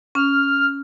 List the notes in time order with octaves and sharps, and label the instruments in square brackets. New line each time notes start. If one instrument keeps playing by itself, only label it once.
[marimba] C#4 [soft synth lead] F6